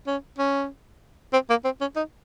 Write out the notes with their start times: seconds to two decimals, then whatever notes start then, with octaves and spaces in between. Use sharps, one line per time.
0.07 C#4
0.39 C#4
1.33 C4
1.50 A#3
1.64 C4
1.81 C#4
1.96 D#4